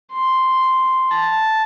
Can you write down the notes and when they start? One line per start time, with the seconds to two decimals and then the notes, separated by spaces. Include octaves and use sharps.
0.11 C6
1.11 A5